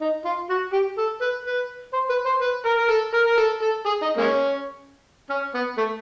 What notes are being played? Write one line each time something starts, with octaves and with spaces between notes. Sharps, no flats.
D#4
F4
F#4
G4
A4
B4
B4
C5
B4
C5
B4
A#4
A#4
A4
A#4
A#4
A4
A4
G#4
D#4
G#3 A#3 C#4
C#4
B3
A3